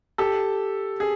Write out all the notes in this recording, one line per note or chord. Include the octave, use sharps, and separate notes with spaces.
G4 A4
G#4